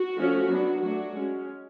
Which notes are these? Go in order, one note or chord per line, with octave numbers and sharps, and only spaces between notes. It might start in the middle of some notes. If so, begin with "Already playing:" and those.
Already playing: F#4
F3 A3 C#4
F#3 B3 D4
F#3 A3 D4 F#4
G#3 C#4